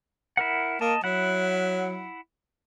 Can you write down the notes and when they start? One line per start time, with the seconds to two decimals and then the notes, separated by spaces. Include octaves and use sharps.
0.37 E4 A#4 F#5
0.81 A#3 D#5 A5
1.04 F#3 E4 F#5